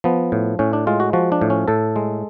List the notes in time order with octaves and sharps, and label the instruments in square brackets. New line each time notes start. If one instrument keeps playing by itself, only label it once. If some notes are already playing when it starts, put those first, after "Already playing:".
[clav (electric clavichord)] F3 B3
A2
A2 C#4
D4
G#3 F4
F#4
F3 F#4
D4
A2
C#4
A2 A4
G#3